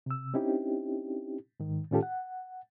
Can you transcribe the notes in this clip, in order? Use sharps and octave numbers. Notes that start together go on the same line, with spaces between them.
C3 E6
C4 C#4 D#4 E4 G4
G#2 D#3
A2 D#3 C#4 F4 G4 A4
F#5